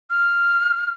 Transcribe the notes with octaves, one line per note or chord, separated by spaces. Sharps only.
F6